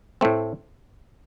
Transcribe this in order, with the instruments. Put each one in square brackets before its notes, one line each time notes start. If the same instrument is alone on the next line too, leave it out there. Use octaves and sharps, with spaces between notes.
[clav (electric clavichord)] A2 A3 C4